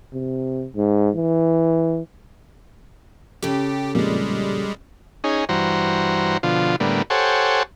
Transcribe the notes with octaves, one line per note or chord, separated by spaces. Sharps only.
C3
G#2
E3
C#3 G4 A4
F2 A#2 G3 G#3
C#4 D#4 G#4
G2 E3 F#4 C5 A#5
B2 D3 F3 F4
A2 D3 G3 A#3 B3
G4 A4 C5 C#5 F#5 G#5